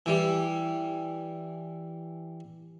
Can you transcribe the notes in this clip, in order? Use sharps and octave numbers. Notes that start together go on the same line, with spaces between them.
E3 G3